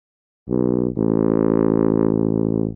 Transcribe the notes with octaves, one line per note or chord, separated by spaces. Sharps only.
B1
A1